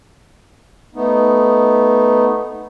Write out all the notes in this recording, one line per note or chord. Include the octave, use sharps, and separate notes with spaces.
A3 B3 D#4